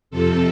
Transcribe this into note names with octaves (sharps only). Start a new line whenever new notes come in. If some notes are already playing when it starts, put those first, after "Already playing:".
F2 C3 F3 A4